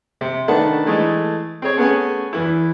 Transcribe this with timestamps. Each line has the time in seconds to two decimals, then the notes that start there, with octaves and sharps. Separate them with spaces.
0.21 C3
0.48 D#3 A3 D4 B4 F#5 A5
0.86 E3 G#3 A3 A4
1.62 C4 G#4 C#5
1.77 A3 B3 C#4 G#4 F#5 G#5
2.33 E2 E3 E4